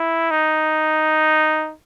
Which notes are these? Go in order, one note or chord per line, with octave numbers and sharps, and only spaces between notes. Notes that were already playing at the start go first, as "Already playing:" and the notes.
Already playing: E4
D#4